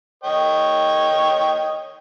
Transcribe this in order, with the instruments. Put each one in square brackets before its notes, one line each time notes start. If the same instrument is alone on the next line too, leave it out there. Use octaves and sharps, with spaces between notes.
[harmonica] C#5 D#5 G5